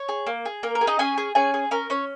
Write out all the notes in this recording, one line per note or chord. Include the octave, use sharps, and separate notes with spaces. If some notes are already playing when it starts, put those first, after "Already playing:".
Already playing: C#5
G#4
A#3
G#4
A#3 A#4
A#4
G#4
D#4 D#5
C#4 G#4 G#5
G#4
C#4 G#4 G#5
G#4
C#4 A#4
C#4 C#5